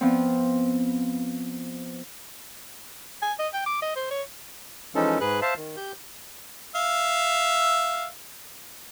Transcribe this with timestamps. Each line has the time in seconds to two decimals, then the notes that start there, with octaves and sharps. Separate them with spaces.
0.01 F3 B3 C4
3.22 G#5
3.39 D#5
3.54 G5
3.66 D6
3.82 D#5
3.96 C5
4.10 C#5
4.95 E3 F3 G#3 C#4 D#4 A4
5.21 G#2 G#4 B4 F#6
5.42 C5 E5 F5 A5
5.57 D#3
5.77 G4 G6
6.75 E5 F5